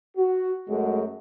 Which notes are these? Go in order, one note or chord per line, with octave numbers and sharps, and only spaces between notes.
F#4
F#2 G#3 A3 F#4 G#4